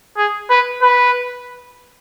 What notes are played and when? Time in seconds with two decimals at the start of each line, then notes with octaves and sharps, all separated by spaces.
0.17 G#4
0.50 B4
0.82 B4